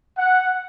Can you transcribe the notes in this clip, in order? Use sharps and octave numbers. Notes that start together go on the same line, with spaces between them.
F#5